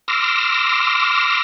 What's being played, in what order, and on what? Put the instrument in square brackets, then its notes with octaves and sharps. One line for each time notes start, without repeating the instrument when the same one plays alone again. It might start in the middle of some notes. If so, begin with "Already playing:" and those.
[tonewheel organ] C6 D6 E6 F6 A#6